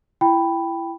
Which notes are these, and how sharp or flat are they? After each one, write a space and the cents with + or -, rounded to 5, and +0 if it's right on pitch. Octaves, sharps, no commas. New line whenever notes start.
E4 +25 G5 +0 B5 +0